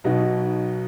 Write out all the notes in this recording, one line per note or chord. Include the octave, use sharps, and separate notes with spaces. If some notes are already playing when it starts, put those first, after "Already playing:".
B1 B2 B3 D#4 F#4